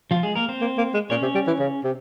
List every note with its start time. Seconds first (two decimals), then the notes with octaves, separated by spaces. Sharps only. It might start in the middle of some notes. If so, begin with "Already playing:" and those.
0.11 F3 F4
0.23 G#3 G#4
0.35 A#3 A#4
0.49 C4 C5
0.61 A#3
0.78 A#3
0.94 G#3
1.10 A#2 C#4 C#5
1.22 C3
1.34 G3
1.47 E3
1.59 C#3
1.84 C3